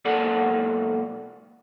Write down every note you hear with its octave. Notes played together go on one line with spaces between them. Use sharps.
B1 G#2 A#3 A4 D5 F#5